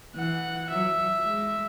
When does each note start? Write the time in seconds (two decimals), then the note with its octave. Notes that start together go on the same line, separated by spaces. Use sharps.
0.15 E3 F#5
0.70 F#3 E5
1.25 G#3